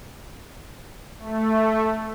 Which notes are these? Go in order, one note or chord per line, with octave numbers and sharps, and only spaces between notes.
A3